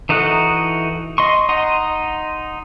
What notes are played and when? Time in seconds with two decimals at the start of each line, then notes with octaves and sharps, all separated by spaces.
0.09 E3 D#4 F#4 A4 F#6
1.18 D#5 C6 C#6
1.49 D#4 D#5 F#5 C6